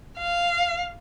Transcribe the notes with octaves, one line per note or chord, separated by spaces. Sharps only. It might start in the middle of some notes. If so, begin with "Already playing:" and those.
F5